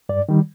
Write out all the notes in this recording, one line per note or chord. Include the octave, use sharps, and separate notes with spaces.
G2 D5
D#3 G3